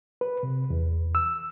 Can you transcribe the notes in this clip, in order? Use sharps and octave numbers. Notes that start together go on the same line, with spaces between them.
B4
C3
E2
E6